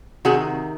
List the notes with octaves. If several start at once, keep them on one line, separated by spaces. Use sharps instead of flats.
C3 D#3 F#4 G#4